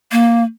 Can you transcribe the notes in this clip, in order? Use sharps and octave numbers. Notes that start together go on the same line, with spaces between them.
A#3